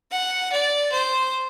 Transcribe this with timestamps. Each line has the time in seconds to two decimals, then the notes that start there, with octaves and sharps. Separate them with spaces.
0.11 F#5
0.52 D5
0.92 C5